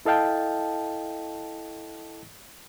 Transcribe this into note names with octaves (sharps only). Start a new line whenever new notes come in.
E4 A4 D#5 F5 G5 A5